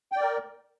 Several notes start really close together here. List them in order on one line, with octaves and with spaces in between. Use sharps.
G5 D5 A#4